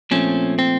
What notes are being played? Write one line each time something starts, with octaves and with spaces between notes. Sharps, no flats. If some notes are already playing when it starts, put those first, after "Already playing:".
A#2 F3 A3 C4 C#4
C4